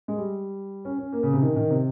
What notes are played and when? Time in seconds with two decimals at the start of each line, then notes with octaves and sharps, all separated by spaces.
0.08 G#3
0.17 G3
0.85 C#4
0.98 C#4
1.13 A#3
1.23 C#3
1.33 C3
1.42 D#3
1.56 D#3
1.70 C3